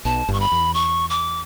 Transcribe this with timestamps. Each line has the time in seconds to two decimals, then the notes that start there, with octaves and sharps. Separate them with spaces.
0.05 B1 B2 A5
0.29 G1 G2 C#6
0.40 B5
0.52 E2
0.74 C#6
1.10 D6